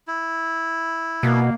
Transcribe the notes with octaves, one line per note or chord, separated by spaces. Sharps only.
E4
B2 A#3